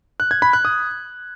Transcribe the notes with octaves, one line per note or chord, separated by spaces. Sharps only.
F#6
G#6
B5
F#6
D#6